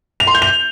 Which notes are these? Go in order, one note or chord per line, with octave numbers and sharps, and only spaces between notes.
F7
C6
G6
F7